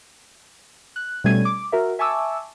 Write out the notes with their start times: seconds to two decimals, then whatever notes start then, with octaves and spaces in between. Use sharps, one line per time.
0.96 F#6
1.24 B2 G3 A3 C#4 G#6 D#7
1.45 D6
1.72 F#4 A#4 E5
1.99 E5 G#5 A5 C#6 D6 E6